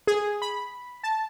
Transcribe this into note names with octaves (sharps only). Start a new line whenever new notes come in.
G#4
B5
A5